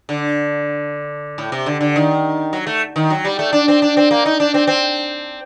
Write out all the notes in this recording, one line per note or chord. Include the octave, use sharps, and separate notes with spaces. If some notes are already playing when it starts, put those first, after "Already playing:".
D3
A2
C3
D3
D3
D#3
F#3
A3
D#3
F#3
G3
A3
D4
C4
D4
C4
A#3
D#4
D4
C4
C4